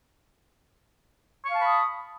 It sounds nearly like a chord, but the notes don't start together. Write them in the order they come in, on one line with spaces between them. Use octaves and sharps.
C#6 F5 A5 B5 D#6